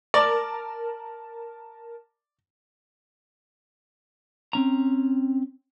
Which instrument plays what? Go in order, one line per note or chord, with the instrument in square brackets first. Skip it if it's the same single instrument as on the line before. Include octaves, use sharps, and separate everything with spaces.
[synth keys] A#4 A5 [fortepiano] D5
[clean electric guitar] C4 C#4 A#5